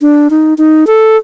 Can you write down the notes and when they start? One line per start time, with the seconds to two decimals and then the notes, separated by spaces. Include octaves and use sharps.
0.01 D4
0.30 D#4
0.58 D#4
0.87 A4